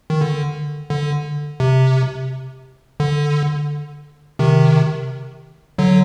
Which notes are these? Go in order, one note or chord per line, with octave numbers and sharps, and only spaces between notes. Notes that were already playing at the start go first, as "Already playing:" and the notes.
D#3
D3
D3
C3
D3
C3 D#3
D3 F#3